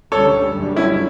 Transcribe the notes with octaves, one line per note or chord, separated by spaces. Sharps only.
D2 D3 G3 C#4 A4 C#5
F#1 F#2 D3 G3
C#4 E4